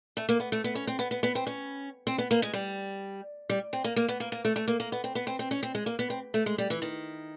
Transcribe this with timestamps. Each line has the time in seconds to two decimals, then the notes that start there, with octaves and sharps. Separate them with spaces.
0.17 A3
0.29 A#3
0.40 B3
0.52 A3
0.64 B3
0.75 C#4
0.87 C4
0.99 B3
1.11 B3
1.23 B3
1.35 C4
1.47 C#4
2.07 C4
2.18 B3
2.31 A#3
2.42 G#3
2.53 G3
3.49 G3
3.73 C4
3.84 A#3
3.96 A#3
4.08 B3
4.20 A#3
4.32 A#3
4.45 A3
4.56 A3
4.68 A#3
4.80 A#3
4.92 B3
5.04 C4
5.15 B3
5.27 C4
5.39 C4
5.51 C#4
5.63 C4
5.75 G#3
5.86 A#3
5.99 B3
6.10 C4
6.34 A3
6.46 G#3
6.58 G3
6.70 E3
6.82 D#3